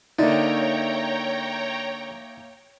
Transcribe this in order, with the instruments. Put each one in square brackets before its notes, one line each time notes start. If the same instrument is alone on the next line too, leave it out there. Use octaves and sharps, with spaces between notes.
[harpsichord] D3 [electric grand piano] A#3 E5 [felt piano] D#4 [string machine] C#5 G5 A#5